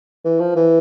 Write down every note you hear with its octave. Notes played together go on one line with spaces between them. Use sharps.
E3
F3
E3